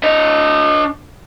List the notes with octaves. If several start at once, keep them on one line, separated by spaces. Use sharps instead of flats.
D4 D#5